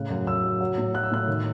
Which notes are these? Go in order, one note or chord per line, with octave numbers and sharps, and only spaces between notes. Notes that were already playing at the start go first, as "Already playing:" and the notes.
Already playing: A2 C#3 F#6
F#2
F#2 E6
F#3
F#3
A2
F#3 F#6
E6
A2 F#6
D#3